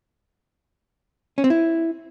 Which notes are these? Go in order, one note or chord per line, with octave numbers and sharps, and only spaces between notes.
C#4
C4
E4